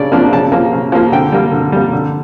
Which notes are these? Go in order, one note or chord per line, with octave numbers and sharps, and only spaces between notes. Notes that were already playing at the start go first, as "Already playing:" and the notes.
Already playing: C#3 D4 D5
F3 A#3 D4
C#3 A5
F3 A#3
C#3
F3 A#3
D3 G5
G3 A#3
D3
G3 A#3
D3